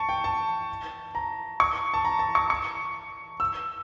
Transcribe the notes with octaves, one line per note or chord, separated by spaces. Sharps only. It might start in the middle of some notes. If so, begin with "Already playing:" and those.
Already playing: A5 C#6
G5
A5
A#5
C#6
A5
A#5
A5
C#6
C#6
E6